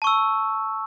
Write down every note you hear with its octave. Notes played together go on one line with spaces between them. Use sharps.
A5 C#6 E6